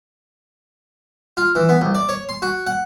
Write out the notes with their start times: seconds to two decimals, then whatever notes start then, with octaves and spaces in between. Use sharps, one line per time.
1.37 F4
1.55 E3
1.69 B3
1.81 C2
1.95 D5
2.09 C#5
2.29 C6
2.42 F#4
2.67 F#5